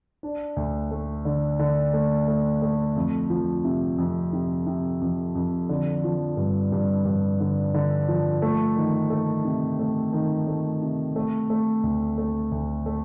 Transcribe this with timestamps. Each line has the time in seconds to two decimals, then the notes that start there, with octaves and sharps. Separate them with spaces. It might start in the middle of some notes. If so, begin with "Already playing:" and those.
0.23 D4
0.56 D2
0.91 A3
1.25 D3
1.59 D3
1.93 A3
2.28 A3
2.62 A3
2.96 F2
3.30 F3
3.65 C3
3.98 F2
4.33 C3
4.67 C3
5.01 F2
5.35 F2
5.69 D3
6.04 F3
6.37 G2
6.72 G2
7.05 G2
7.40 D3
7.74 D3
8.08 F3
8.42 A3
8.76 D#3
9.10 A3
9.45 C3
9.79 A3
10.13 D#3
10.47 A3
10.82 C3
11.16 A3
11.50 A3
11.83 D2
12.18 A3
12.52 D2
12.86 A3